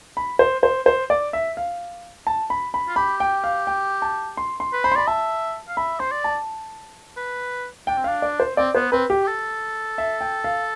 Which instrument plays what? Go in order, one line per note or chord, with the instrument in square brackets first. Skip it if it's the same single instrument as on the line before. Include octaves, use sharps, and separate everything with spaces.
[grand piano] B5
C5
C5
C5
D5
E5
F5
A5
B5
B5
[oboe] F4
[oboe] G4 [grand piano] B5
[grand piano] G5
F5
G5
A5
C6
C6
[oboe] B4
[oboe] C5 [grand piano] B5
[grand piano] C6
[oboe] D5 [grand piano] B5
[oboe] E5 [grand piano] A5
[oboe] F5
[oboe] E5 [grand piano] B5
[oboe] C5 [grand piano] C6
[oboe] D5
[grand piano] A5
[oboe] B4
[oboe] D4 [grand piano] G5
[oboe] C4
[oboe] D4 [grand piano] F5
[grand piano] D5
C5
[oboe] C4 [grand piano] D5
[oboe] B3 [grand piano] C5
[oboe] C4 [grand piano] B4
[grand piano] G4
[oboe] G4
A4
[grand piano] E5
G5
F5